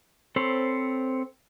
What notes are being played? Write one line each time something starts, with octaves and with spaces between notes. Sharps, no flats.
C4 A4 C5 C#5 B5